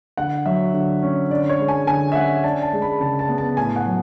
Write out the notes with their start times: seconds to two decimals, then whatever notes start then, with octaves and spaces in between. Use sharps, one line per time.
0.17 D3 F#5
0.46 F#3 E5
0.74 D3
1.03 C#4
1.30 D3 D5
1.49 C#5
1.59 G#3
1.68 G#5
1.87 D3 G#5
2.12 E5
2.16 C#4 F#5
2.44 D4 A5
2.62 A5
2.73 G#3
2.82 B5
3.01 C#3 A5
3.19 A5
3.29 B3
3.38 A5
3.57 A2 G#5
3.76 F#5
3.86 F#3